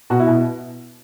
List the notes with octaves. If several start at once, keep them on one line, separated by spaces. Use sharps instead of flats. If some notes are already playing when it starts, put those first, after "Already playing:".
B2 F#4
E4
B2